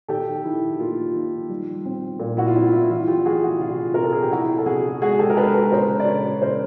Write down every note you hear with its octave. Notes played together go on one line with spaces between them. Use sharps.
D#3 G4 A4
D#3 E4
A#3 F4
D#3
G3
C4
A#2
E4 F#4
F4
C4 E4
E4
E4
E3 F4
F4 G4
A3 F#4 G#4
E4 F#4
C3 F4
C3 A#4
A4
G#4
G4
C3 E4 F#4
A4
C3 F#4 G#4
G#3 F#4 G#4
G4 A4
A#4
G#3 A4 B4
A4 B4
C#3 A#4 C5
D5
C#3 B4 C#5
C#3 A#4 C5